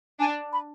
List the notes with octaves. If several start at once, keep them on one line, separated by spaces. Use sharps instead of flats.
D4 G#5
B5